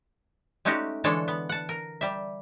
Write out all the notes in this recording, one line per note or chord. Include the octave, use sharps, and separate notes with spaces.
G#3 A3 C#4 D#4 F#4 G4
D3 E3 G#3 D4 A4 C#5
B3
F#5 A5
A#4
G3 E5